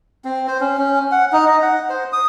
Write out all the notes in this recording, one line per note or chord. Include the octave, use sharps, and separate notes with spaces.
C4
C5
C#4
C#4
F#5
D#4
D#5
F#5
C5
D#6